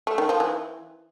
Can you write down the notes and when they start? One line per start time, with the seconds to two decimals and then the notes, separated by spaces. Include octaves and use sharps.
0.07 A3
0.18 D#3
0.29 F3
0.40 E3